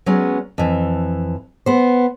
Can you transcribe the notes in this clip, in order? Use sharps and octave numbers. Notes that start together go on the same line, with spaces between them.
F#3 G#3 B3 C#4
F2 E3
B3 C5